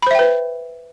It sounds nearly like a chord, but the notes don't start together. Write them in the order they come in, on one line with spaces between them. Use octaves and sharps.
B5 C5 E5 G5 B4